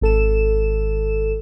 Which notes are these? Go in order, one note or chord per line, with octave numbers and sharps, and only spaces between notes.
G#1 A4 E7